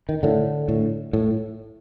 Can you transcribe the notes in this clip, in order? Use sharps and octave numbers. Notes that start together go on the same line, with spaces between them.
D#3
A2 D3
A2
A2